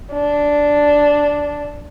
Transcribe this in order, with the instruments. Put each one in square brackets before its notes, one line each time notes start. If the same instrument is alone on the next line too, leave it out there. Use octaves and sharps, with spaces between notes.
[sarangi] D4